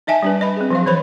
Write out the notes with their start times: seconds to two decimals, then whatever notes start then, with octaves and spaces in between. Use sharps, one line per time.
0.07 D#4 D#5 E5 G#5 A5
0.23 G3 D4 B4
0.41 D#5 B5
0.56 C4 G#4
0.70 F3 F#3 F5
0.86 E3 C5 C#5 B5